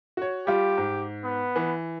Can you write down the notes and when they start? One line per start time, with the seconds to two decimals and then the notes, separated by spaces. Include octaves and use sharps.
0.17 F#4 C#5
0.47 G3 F4 G4
0.78 G#2
1.24 B3
1.56 E3